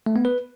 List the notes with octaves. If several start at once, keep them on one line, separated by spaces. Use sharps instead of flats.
A3
B3
B4